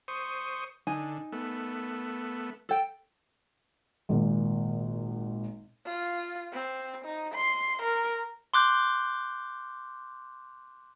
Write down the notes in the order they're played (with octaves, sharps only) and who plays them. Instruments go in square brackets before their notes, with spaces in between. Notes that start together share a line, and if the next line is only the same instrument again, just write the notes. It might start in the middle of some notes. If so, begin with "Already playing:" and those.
[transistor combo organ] C5 C#6 D#6
[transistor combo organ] D3 [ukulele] D#4 G#5
[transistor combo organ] A3 B3
[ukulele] A4 G5
[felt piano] G#1 A#2
[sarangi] F4
C4
D#4
C6
A#4
[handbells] C6 D6 F#6 G6